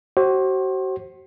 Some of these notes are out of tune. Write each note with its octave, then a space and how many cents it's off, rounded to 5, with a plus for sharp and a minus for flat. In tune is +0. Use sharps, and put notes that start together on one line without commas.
F#4 +40 C5 +30